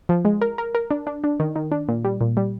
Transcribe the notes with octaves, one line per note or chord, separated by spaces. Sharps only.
F3
G#3
A#4
A#4
A#4
D4
D4
D4
D#3
D#3
D4
A#2
G3
A#2
G3